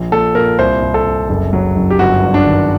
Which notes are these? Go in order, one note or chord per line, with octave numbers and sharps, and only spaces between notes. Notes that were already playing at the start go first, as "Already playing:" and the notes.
Already playing: A#1
A#2 A4
A#2 A#4
C2 C5
C2
A4
C2
F#1
F#3
F#1
G4
G1 F#4
G2
D4
D#3